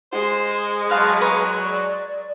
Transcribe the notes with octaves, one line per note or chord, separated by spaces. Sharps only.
G#3 C5
F#3 B4 F5 A5 C6
B4 A#5 C#6
D5